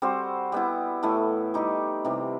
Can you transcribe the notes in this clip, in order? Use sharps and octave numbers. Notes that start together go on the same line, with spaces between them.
G3 C4 F#4 C5
G3 B3 E4
A2 E3 A3 E4
G3 D#4 G4
C3 E3 G3